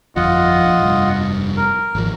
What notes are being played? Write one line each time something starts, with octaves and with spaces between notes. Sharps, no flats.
G1 F2 F3 F4 D#5 F#5
A#1 F3
F1 G2
A#4
G#1 F3